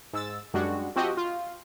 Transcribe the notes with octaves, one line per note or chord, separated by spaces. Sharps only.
G#2 E6 A6
F#2 G3 G#3 D4 F#4
F3 C4 F#4 G4 D#5
F4